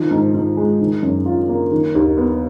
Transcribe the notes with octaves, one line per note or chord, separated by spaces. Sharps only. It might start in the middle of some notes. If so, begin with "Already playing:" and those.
Already playing: D#3 F3
G#2
G#2
G#3
D#3
F#2
F4
A#3
D#3
D#2
B3